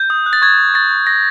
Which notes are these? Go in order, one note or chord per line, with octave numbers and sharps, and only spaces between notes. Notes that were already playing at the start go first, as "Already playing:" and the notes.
Already playing: G6
D#6
F#6
A6
C#6 G#6
C#6
C#6 A6
C#6
D#6 A#6